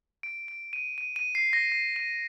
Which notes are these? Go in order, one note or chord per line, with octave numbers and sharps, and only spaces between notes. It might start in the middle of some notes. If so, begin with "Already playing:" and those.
D7
D7
D#7
D#7
D#7
C7
A#6
C7
D#7